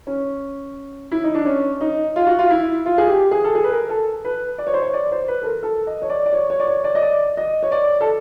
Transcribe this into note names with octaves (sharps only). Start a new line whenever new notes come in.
C#4
E4
D#4
D4
C#4
D#4
F4
F#4
F4
E4
F4
G#4
G4
G#4
A4
G#4
B4
A#4
A4
B4
D5
C#5
C5
C#5
D5
C5
B4
A4
A#4
A4
D#5
C#5
D5
D5
C#5
C#5
D5
C#5
D5
D#5
D5
D#5
C#5
D5
A4